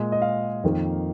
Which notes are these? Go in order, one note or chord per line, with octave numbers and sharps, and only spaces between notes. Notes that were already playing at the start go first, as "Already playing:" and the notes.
Already playing: A#2 G#3 G#5
D#5
F5
F2 D#3 A#3